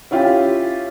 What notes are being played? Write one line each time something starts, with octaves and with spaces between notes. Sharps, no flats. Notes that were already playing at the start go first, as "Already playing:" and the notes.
C#4 E4 F4 G4